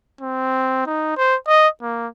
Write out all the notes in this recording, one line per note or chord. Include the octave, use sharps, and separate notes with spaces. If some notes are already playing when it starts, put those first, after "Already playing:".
C4
D#4
C5
D#5
A#3